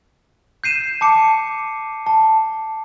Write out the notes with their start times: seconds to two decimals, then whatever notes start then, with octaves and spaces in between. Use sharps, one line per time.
0.64 G6 C7 D#7 E7
1.01 A5 D6 C#7
2.06 A5